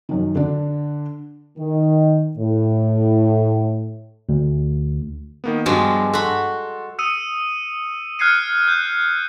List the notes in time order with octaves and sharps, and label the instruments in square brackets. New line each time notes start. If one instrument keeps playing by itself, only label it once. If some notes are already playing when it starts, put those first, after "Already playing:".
[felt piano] F#2 D#3
D3 D4
[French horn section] D#3
A2
[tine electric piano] D2
[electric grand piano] D#3 A#3 B3
[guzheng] G2 F3 G#3 [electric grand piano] G3 B3 F#4
[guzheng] F#4 B5 [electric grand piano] A4 C6
[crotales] D#6 E6 C#7 D#7 F7
F6 F#6 G#6 C7 C#7 D#7
F#6 G6